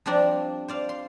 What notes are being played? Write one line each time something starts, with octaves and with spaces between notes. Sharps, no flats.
F3 G3 C4 D4 D5 A#5
C5 D5 F5
C6